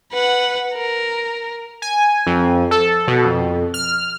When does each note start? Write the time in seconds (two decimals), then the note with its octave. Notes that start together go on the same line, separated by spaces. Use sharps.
0.12 B4 F#5
0.74 A#4
1.82 G#5
2.27 F2
2.71 A4
3.08 B2
3.25 F2
3.74 F6